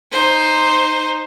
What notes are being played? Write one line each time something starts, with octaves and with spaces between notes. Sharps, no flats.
D#4 C5